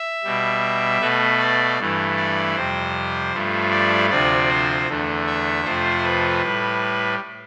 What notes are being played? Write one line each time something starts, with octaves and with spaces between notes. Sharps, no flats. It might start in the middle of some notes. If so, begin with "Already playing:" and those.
Already playing: E5
B2 G3
B2 A3 B4
D5
G2 E3 A3
D5
F2 C3 G3 C5
G2 F3 A3
D5
D2 C3 F3 D5
C5
E2 D3 A3
E5
F2 C3 F3 A3 C5
B4
A2 G3